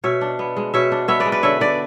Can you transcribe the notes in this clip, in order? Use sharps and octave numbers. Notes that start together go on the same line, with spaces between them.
B2 C#5 E5
D4
B3
G#3
B2 C#5 E5
D4
B3 C#5 E5
B4 D5
G#3
B4 D5
D3 C#5 E5
D3 B4 D5